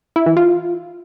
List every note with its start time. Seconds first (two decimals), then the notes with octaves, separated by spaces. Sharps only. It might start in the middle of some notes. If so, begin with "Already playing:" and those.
0.16 E4
0.26 E3
0.37 F4